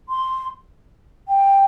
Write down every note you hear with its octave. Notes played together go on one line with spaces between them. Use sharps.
C6
G5